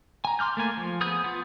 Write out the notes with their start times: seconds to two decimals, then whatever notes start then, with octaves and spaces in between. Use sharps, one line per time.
0.25 G#5 A#5
0.39 C6 D6 F6 G6
0.57 A3 A#3 G#5
0.77 F3
1.01 B3 G#4 D#6 G6
1.24 B3 F4